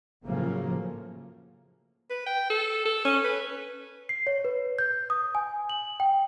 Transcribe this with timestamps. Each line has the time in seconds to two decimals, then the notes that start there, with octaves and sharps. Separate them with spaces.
0.24 A2 C#3 F3 F#3 A3 A#3
2.10 B4
2.26 G5
2.50 A4
2.85 A4
3.05 C#4
3.24 B4
4.09 C7
4.27 C#5
4.45 B4
4.79 G6
5.10 D#6
5.35 G#5
5.69 F#7
6.00 G5